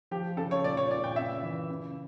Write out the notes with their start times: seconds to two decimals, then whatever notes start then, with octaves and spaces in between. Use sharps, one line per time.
0.11 F3 G4
0.37 C#3 A4
0.51 C#5
0.64 A#2 D5
0.77 C#5
0.90 A#2 D5
1.04 G5
1.16 C#3 E5
1.43 E3
1.69 C#3